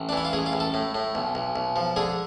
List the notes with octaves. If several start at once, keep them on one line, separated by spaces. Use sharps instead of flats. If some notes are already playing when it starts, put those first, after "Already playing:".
Already playing: A1
D4
E3 E4
F4
A1 G#4
F4
A1
A4
A2
A2
B1
B1
B1
F3
D3 G#4